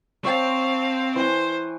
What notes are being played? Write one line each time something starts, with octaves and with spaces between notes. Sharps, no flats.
C4 C#5 F5 G5 A5
E3 C5 G#5